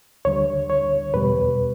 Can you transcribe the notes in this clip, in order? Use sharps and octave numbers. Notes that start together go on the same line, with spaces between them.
D2 D3 G3 C#5
C#5
E2 B2 G3 B4